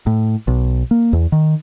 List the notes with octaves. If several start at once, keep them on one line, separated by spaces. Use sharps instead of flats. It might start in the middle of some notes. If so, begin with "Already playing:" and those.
A2
B1
A#3
E2
D#3